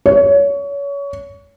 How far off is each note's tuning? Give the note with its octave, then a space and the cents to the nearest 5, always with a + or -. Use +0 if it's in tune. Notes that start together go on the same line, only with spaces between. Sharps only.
C#5 +25